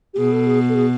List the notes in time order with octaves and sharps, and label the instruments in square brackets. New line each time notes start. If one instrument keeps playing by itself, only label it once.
[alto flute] G4
[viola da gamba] B2 [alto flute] G#4
[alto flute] A4
G#4
A4
G#4